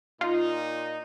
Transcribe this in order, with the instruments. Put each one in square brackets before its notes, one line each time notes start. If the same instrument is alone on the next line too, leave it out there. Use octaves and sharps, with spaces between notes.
[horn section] A#2 D#4 [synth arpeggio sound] F4